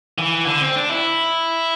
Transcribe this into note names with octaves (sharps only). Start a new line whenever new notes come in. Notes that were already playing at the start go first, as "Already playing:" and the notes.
E3
D3
C4
D4
E4